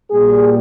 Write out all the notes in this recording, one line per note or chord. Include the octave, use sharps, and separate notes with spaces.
A#2 G3 G#4